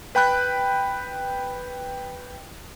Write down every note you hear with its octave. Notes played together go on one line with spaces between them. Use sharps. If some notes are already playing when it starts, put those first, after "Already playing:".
B4 G5 B5 F#6